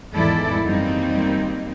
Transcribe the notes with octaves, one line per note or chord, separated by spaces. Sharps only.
E2 G#2 D#3 E4 A4 D5
F#2 D#3 G3 A#3 C4 D#4